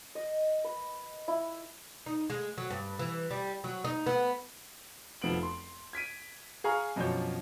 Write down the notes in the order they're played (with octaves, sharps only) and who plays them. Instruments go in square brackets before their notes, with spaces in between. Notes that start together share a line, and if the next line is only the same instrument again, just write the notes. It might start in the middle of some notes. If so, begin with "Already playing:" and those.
[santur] D#5
B4
E4
[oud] D#4
G#3
F#3
G2
E3
G3
F#3
D#4
B3
[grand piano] F1 F3 B3 D7 F#7
C6
G#6 B6 D7 D#7
G#4 F5 G#5 A#5 C#6 F6
F#2 B2 F3 D4 C#5 G6